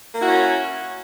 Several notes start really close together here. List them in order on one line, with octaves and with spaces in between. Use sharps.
A#3 E4 F#4 C#4